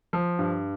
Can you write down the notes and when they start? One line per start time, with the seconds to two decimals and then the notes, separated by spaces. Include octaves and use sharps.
0.13 F3
0.39 G2